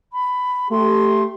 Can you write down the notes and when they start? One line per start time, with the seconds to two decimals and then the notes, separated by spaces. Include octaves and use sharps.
0.12 B5
0.70 A3 G4 C6